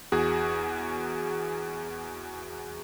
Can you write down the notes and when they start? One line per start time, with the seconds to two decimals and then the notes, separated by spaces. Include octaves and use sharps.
0.12 E2 F#4 G#4